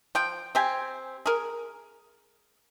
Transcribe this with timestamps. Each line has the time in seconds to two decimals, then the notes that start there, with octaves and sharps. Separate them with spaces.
0.15 F3 G5
0.55 C4 G4 G#5
1.26 G#4 A#4